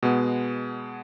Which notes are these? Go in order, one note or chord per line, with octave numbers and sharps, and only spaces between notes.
B2 G#3 B3